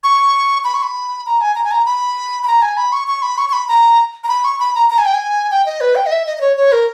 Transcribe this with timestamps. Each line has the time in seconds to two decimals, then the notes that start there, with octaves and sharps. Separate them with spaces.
0.04 C#6
0.64 B5
0.74 C#6
0.83 B5
1.26 A#5
1.41 G#5
1.55 A#5
1.64 G#5
1.71 A#5
1.86 B5
2.43 B5
2.47 A#5
2.62 G#5
2.77 B5
2.92 C#6
3.08 C#6
3.22 B5
3.38 C#6
3.49 C#6
3.53 B5
3.69 A#5
4.24 A#5
4.29 B5
4.44 C#6
4.60 B5
4.75 A#5
4.90 A#5
4.98 G#5
5.05 G5
5.14 G#5
5.51 G5
5.66 D#5
5.81 B4
5.95 G5
6.06 D#5
6.12 E5
6.26 D#5
6.37 D#5
6.41 C#5
6.57 C#5
6.72 A#4